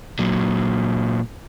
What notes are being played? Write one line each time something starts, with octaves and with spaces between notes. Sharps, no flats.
A#2 F#3